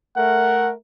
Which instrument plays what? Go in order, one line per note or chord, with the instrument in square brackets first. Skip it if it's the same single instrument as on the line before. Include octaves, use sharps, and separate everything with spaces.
[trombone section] A3 A#4 [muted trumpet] F#5